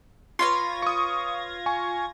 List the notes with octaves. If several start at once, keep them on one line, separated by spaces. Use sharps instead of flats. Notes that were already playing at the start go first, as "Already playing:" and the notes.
F4 B4 C#5 C6 G#6 A#6
C#6 D#6
G#5 C#6